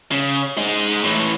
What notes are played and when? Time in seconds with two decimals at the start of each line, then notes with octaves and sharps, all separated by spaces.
0.11 C#3
0.57 G#3 D#4
1.03 A2 E3